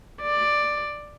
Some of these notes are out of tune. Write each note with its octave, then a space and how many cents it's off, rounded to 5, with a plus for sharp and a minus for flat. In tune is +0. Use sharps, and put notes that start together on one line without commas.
D5 +10